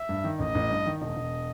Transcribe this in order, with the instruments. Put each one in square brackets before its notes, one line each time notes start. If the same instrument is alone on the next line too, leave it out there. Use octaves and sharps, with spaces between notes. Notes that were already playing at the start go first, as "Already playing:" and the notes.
Already playing: [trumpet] E5
[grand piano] G2
D#3
[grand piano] A1 [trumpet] D#5
[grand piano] A1
G2
D#3
[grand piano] E1 [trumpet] D#5
[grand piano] E1